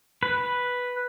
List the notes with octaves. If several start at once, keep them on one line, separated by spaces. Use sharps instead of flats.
B4